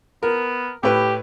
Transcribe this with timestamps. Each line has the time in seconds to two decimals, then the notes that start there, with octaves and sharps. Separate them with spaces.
0.23 B3 A#4
0.83 A2 G4 B4